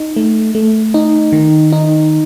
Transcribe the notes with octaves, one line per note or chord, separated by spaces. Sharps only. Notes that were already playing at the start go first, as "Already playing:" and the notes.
Already playing: D#4
A3
A3
D#4
D#3
D#4